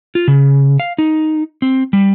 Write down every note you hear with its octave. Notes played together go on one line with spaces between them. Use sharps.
F4
C#3
F5
D#4
C4
G3